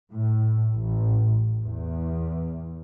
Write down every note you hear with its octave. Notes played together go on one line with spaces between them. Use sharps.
A2
A1
E2